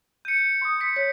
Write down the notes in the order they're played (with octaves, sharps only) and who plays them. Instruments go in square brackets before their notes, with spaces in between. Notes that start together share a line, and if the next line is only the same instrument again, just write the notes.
[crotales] G6 C#7 [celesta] D#7
[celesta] C6 D#6
[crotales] B6 C#7
[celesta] C#5 [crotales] B6